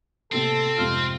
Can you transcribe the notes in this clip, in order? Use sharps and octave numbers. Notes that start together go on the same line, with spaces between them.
A2 C3 A#3 C4 A4
F2 G#2 C3 F4